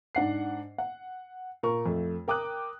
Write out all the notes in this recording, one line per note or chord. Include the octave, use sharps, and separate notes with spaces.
G#2 D4 F#5 C7
F#5
A#2 A#4 C#6
F2 A3
A#4 G5 D6 D#6 F#6